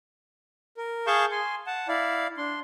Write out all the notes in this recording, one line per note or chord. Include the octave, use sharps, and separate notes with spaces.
A#4
G#4 F5 A5 C#6 G6
G#5 C6
F#5 A5
E4 D5 F5
D4 C6